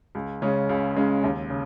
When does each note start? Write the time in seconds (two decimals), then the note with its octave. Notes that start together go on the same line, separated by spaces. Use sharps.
0.15 C#2
0.42 C#3 G#3 C#4
0.69 C#2
0.96 C#3 G#3 C#4
1.24 D#2
1.50 C#3